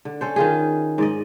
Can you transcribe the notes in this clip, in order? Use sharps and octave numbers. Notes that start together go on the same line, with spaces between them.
D3
C#4 A4 C5
D#3 F4 G#4
G#2 D5 D#5